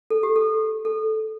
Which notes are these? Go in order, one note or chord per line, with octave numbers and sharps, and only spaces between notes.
A4
G4
A4
A4